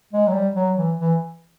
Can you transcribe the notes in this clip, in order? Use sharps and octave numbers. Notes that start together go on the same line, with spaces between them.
G#3
F#3
G3
F#3
E3
E3